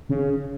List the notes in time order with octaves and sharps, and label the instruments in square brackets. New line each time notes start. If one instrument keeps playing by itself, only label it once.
[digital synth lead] C#3